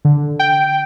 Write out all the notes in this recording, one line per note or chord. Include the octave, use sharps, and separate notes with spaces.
D3
G5